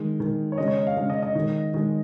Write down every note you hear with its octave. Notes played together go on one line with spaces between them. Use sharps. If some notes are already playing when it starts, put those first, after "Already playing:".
Already playing: D#3 G#3
D#3 G#3
C#5
C#3 G#3 D#5
C#5
D#5
F5
C#3 G#3 F5
D#5
D#5
D#3 G#3
D#3 G#3